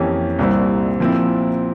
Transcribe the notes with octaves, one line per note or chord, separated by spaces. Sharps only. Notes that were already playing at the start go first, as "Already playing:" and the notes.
Already playing: F2 E3 A#3 C#4 G4
C2 A#2 G3 C4 E4
A#2 F3 C4 E4